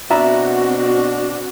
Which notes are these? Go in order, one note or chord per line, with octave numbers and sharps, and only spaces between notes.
B2 C4 D4 F#4 E5 A#5 B5